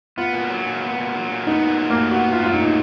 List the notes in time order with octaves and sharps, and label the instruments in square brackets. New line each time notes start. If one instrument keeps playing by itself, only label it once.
[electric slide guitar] B3 [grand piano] F4
[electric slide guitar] A#2
F#3
A#2
B3
A#2
F#3
A#2
[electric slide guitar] B3 [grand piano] D#4
[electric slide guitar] A#2
F#3
[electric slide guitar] A#2 [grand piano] A#3
[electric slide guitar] B3 [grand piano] F#4
[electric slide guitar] A#2 [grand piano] F4
[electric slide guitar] F#3 [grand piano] F4
[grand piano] D#4
[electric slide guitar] A#2
[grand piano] D#4